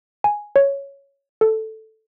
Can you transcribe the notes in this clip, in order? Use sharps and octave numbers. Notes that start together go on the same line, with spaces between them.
G#5
C#5
A4